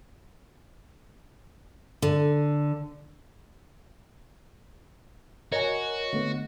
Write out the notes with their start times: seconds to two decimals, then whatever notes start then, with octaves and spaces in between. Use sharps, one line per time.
2.02 D3
5.52 F#4 A#4 C#5 D#5 G#5
6.13 D3 A3 B3